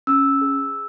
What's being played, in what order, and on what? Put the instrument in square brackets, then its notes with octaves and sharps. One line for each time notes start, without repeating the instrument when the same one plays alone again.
[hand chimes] C#4 E6
G#4